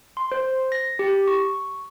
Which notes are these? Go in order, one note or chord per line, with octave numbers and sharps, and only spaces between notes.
C6
C5
A#6
G4
C#6